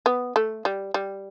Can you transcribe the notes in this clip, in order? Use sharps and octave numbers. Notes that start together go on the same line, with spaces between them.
B3
A3
G3
G3